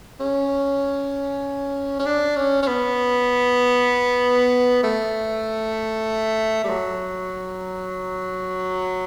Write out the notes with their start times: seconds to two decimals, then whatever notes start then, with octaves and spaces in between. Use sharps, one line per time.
0.20 C#4
1.99 C#4
2.06 D4
2.36 C#4
2.63 C#4
2.68 B3
4.83 A3
6.64 G3
6.69 F#3